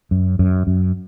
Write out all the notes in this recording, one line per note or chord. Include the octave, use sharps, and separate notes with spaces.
F#2
F#2
F#2